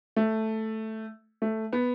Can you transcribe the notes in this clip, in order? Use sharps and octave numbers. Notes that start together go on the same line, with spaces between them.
A3
A3
B3